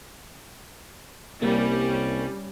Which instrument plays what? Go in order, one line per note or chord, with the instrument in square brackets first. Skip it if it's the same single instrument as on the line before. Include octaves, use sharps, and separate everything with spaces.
[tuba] C2 [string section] G3 C#4 [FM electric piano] A#3